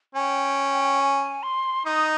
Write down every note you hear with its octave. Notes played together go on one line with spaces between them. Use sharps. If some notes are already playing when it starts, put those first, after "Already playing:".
C#4 G5 G#5
G#5
C6
D#4 D#6